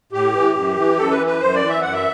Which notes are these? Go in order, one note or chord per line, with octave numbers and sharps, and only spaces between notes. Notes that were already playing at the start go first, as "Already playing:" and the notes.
A2 G4
E3
F#2
E3
F#2 A4
B4
E3
B4
F#2 C5
D5
E3
E5
F#2 F#5
E5